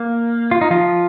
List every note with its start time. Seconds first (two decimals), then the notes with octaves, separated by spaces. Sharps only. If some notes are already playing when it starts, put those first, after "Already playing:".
Already playing: A#3
0.51 F4
0.61 D#4
0.71 F3 F4